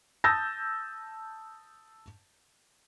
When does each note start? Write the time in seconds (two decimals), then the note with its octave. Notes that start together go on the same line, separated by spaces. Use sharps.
0.24 A5 D#6 E6 G6 A6 A#6